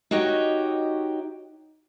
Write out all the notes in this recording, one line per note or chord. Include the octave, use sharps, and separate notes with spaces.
D#4 F#4 G4 C#5 D#5